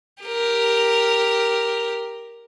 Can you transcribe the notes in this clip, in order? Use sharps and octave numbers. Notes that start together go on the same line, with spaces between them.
G4 A#4